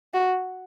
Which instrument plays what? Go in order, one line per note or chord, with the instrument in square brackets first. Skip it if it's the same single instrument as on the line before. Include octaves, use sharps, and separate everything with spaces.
[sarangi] F#4